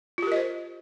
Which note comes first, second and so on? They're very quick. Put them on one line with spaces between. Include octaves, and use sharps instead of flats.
F4 G4 A#4 D#5 C5